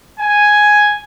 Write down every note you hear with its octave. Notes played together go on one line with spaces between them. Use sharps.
G#5